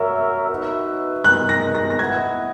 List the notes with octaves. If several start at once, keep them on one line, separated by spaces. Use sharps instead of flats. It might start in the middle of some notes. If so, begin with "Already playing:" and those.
Already playing: F#4 A#4 C#5 E5 E6
D#4 F#4 B4 E5
G#3 D#4 A#4 F#6
A#6
A#6
A#6
E4 B4 D#5 F#5 G#6